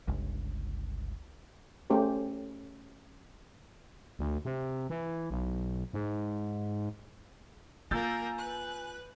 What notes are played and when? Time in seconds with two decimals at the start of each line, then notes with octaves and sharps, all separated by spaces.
0.08 G1 C#2
1.90 A3 C#4 G4 G#4 C5
4.19 D2
4.45 C3
4.90 E3
5.31 B1
5.94 G#2
7.91 A#3 F4 A#4 G#5 E6 G6 A6
8.38 B4 F#6